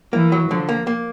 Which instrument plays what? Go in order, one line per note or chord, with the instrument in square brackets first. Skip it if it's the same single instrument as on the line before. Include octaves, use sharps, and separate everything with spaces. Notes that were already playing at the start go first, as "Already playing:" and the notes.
[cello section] E3 [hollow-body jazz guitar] A#3
[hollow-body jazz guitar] F#3
[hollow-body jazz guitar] D3 [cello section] F3
[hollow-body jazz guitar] A#3
A#3